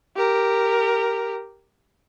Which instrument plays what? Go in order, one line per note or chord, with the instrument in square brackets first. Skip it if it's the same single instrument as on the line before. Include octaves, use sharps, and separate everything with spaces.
[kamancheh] G4 A#4